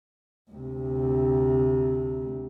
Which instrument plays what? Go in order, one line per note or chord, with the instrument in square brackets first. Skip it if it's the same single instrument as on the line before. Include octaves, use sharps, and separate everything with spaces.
[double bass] D2 C3